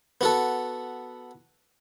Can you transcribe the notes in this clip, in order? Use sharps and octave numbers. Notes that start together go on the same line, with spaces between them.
B3 F#4 A4